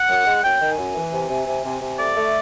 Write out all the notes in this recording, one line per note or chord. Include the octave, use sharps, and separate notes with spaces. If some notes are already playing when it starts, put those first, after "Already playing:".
Already playing: F#5
F#2
G#3
F#2 G5
D#3
G#5
F#2
E3
C3
C3
C3
C3
C3
A3 D5
A3